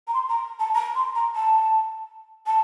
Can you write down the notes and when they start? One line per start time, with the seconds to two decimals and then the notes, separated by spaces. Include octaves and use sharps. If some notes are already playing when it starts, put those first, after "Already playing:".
0.08 A#5
0.14 C6
0.29 A#5
0.60 A5
0.75 A#5
0.95 C6
1.15 A#5
1.35 A5
2.46 A5